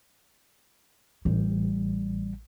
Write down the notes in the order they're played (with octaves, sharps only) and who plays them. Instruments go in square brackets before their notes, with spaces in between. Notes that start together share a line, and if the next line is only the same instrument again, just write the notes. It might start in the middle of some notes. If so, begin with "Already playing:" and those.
[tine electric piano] A1 [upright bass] G3